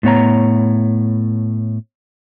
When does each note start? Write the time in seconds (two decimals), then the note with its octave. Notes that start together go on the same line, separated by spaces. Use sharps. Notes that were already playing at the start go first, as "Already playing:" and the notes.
0.03 A2 B3 C#5 A#5